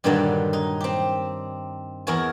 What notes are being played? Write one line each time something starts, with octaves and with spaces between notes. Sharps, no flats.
G2 A#2 D3 D#3 F#3 G3
D#4
C4 G4
E2 E4 A#4 C#5 G#5